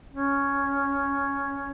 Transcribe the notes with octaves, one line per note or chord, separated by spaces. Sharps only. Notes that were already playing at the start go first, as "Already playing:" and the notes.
C#4